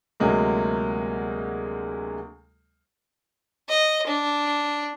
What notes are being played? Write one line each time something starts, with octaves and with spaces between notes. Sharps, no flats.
D2 C3 F#3 G#3 A#3
D#5
D4